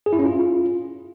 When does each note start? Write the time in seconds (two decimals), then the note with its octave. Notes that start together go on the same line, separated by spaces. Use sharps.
0.06 G#4
0.13 E4
0.19 C#4
0.25 F4